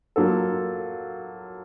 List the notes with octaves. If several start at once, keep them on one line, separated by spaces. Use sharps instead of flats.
F#3 A#3 F4 A4